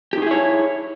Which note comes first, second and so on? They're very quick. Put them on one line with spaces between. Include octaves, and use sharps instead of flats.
G4 D#4 G#4 E4 C#5